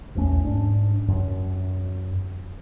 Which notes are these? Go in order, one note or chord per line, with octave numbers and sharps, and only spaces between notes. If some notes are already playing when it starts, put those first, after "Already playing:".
A#1 E2 A3 C#4
G#2 D4
F#2